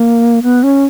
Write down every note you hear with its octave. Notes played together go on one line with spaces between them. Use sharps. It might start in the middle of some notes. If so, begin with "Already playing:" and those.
Already playing: A#3
B3
C#4